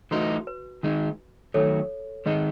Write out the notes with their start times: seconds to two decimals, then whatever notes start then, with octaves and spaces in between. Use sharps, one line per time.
0.11 E3 A3 D#4 F#4
0.47 B4
0.83 D#3 G#3 D#4
1.54 D#3 F#3 A3 A4 C#5
2.26 D#3 G#3 D#4 B4 D#5